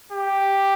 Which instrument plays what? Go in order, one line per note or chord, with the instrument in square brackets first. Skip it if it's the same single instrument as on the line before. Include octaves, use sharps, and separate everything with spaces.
[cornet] G4